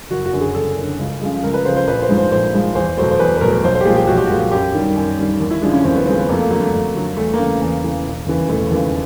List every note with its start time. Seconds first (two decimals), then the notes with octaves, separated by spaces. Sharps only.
0.10 F#1 F#4
0.26 F#4
0.33 F#2 D3
0.41 G#4
0.54 F#1 A4
0.76 F#2 D3
0.99 C#2
1.22 C#3 F3 G#3
1.43 C#2 A#4
1.54 B4
1.65 C#3 F3 G#3 C5
1.76 C5
1.87 A#1 B4
2.02 C5
2.09 G#2 F3 G#3
2.17 C5
2.31 A#1 C5
2.53 G#2 F3 G#3
2.75 E2 C5
2.97 B2 F#3 A3 C5
3.11 C5
3.19 E2 B4
3.37 B4
3.41 B2 F#3 A3 A#4
3.53 A#4
3.64 B1 C5
3.75 C5
3.81 G4
3.85 A#2 F3 G#3 G#4
3.96 G4
4.07 B1 F#4
4.17 G4
4.26 A#2 F3 G#3 F#4
4.51 F#2 G4
4.74 D#3 G3
4.96 F#2
5.18 D#3 G3
5.40 D#2
5.51 E4
5.62 C#3 F3 G#3 D4
5.74 C#4
5.84 D#2 C4
5.96 B3
6.06 C#3 F3 G#3 C4
6.18 B3
6.29 F2 A3 A#3
6.39 A#3
6.51 D3 F#3 A#3
6.62 A3
6.73 F2
6.94 D3 F#3
7.17 E2 A3
7.34 A#3
7.38 C#3 E3 A3
7.61 E2 A#3
7.83 C#3 E3
8.06 E1
8.26 D#2 C#3 E3
8.49 E1 A3
8.71 D#2 C#3 E3